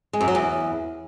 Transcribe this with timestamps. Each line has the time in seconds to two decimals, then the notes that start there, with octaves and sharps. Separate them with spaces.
0.13 G#3
0.21 F#2
0.28 F#3
0.35 E2